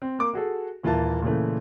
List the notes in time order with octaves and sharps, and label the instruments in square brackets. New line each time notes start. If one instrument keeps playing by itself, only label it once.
[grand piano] C4
A#3 D6
F#4 G#4 A4
D#1 E3 A#3 F4 E5 A5
A#2 C#3 E3 A3